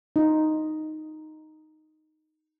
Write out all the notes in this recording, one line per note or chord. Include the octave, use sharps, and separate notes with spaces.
D#4 F4